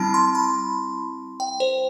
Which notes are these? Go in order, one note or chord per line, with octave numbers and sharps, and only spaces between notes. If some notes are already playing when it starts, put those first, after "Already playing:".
Already playing: G3 C4 E4 A5 B5
C6
B5
G5
C5